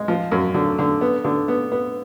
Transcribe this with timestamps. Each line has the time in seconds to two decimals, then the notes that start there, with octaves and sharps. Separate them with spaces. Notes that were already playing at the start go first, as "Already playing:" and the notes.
Already playing: G#3
0.08 F3
0.31 F#2
0.54 D3
0.79 D3
1.01 B3
1.24 D3
1.48 B3
1.72 B3